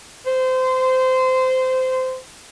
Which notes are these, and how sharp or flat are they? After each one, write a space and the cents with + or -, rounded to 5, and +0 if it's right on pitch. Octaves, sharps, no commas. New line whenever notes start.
C5 -20